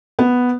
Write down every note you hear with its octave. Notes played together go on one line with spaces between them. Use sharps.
B3